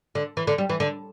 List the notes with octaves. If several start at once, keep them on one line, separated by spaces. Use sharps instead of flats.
D3
E3
D3
G3
E3
D3